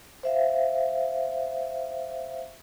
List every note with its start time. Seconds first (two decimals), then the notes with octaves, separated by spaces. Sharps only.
0.23 C5 E5 F5